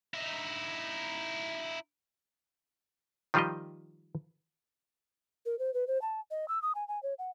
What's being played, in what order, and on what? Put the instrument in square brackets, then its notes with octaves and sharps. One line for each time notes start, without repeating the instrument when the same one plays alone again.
[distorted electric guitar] D#4 E4
[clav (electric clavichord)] D#3 F3 G3 F4 G4 D#5
[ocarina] A#4
C5
B4
C5
A5
D#5
E6
D#6
G#5
G#5
C#5
F#5